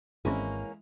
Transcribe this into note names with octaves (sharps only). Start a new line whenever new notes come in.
G#1 D3 E3 G#3 A#3 C4 C#4 E4